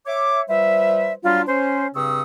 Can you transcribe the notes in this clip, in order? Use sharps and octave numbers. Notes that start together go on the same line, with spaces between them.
C#5 E5 D6
F3 G3 B4 C5 E5
F#3 G3 D4 F4
C#4 C5
G2 C#3 C4 C#6 D#6 E6